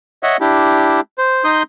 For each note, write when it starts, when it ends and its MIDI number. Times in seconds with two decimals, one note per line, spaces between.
0.23 0.37 73
0.23 0.37 75
0.23 0.37 76
0.23 0.37 78
0.41 1.01 62
0.41 1.01 64
0.41 1.01 67
1.18 1.44 72
1.44 1.63 63
1.44 1.63 84
1.44 1.63 87
1.44 1.63 91